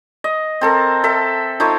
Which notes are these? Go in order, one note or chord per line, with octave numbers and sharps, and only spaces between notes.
D#5
C4 A4 A#4
A4 E5
F3 D#4 A4 C#5